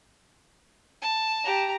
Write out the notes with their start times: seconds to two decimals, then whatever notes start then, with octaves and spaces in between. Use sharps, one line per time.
1.02 A5
1.44 G4 A#5